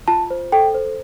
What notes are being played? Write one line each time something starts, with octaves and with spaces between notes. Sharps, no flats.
F4 A5
C5
A4 G5
C5